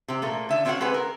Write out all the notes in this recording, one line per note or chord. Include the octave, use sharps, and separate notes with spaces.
C3 C4
A#2 A3 A#3
D3 E5
B3 C4 F#4 C#5 F5 F#5
G#3 C4 G4 B4 F#5
A#4